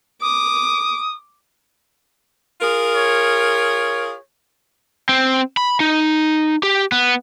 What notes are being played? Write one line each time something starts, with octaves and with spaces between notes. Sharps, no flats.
D6 D#6
F4 G#4 A#4
C#5
C4
B5
D#4
G4
B3